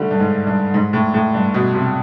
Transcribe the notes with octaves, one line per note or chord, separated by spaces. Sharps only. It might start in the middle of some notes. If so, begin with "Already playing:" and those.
Already playing: D3 G3 A3
G2
G#2
G2
G#2
A2
A2
G2
B2
C3